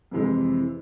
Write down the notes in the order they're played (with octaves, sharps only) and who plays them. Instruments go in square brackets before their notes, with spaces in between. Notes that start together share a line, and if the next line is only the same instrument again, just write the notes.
[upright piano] F2 C3 E3 G#3